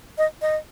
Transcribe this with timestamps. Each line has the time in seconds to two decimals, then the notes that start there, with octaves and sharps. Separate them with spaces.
0.18 D#5
0.42 D#5